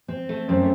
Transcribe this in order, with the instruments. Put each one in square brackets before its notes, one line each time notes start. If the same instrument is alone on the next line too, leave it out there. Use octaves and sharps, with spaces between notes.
[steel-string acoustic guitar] C4
A3
[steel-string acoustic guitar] F#2 [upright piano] C4